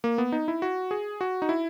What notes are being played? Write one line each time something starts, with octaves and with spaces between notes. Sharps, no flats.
A#3
B3
D#4
E4
F#4
G#4
F#4
D#4
E4